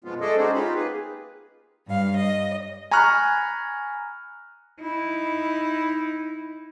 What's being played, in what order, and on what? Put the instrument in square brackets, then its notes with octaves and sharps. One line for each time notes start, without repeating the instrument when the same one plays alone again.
[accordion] F#2 B2 F3 G#3 B3 F4
G#3 A3 G#4 A4 D5 D#5
C#4 D#4 F#4 G#4 C5
D#4 F4 G4 B5
A#3 G#4 B4
[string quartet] G2 F5
D#5
[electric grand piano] G#5 A#5 B5 C#6 F6 F#6
[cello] D#4 E4